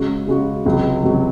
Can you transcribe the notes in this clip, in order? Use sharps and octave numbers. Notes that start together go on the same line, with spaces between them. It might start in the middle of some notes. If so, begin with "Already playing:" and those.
Already playing: C#3 G#3 C#4 F#4
C#3 G#3 C#4 F#4
C#2 C3 F#3
C#2 C3 F#3